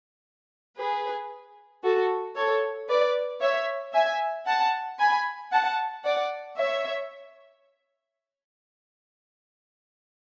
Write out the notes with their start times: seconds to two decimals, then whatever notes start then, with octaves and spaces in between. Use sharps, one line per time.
0.78 G#4 B4
1.83 F#4 A4
2.35 A4 C#5
2.88 B4 D5
3.41 C#5 E5
3.93 E5 G#5
4.47 F#5 A5
4.99 G#5 B5
5.51 F#5 A5
6.04 D5 F#5
6.57 C#5 E5